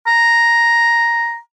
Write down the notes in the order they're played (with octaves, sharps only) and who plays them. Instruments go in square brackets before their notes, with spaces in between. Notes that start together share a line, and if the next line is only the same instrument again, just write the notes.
[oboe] A#5